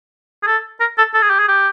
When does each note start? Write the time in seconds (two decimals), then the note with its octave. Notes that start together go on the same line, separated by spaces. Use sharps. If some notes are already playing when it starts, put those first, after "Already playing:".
0.43 G#4
0.47 A4
0.80 A#4
0.98 A4
1.14 A4
1.22 G#4
1.30 G4
1.39 G#4
1.48 G4